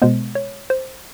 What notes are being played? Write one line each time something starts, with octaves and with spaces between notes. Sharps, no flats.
B2 G#3 B3 C5
C#5
C5